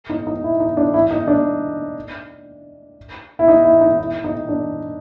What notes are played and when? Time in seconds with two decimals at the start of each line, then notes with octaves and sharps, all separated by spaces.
0.09 D#4
0.27 D#4
0.44 E4
0.60 D#4
0.77 D4
0.94 E4
1.11 D#4
1.28 D4
3.39 E4
3.48 D#4
3.65 E4
3.81 D#4
3.98 E4
4.24 D#4
4.49 D4